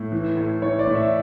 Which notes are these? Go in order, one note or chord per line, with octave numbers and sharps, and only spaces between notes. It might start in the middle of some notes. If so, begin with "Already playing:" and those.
Already playing: A2
E3
A2
E3 C#5
D5
A2
E5